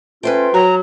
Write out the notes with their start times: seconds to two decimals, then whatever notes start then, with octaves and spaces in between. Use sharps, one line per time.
0.23 A3 C#4 F4 B4 C5 G5
0.54 F#3 F#4 A#5